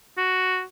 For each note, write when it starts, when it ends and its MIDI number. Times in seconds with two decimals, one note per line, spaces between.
0.17 0.63 66